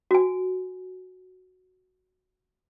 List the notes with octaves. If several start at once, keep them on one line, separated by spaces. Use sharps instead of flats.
F#4 G#5